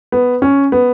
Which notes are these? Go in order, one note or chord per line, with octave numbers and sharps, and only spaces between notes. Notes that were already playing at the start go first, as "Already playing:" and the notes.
B3
C#4
B3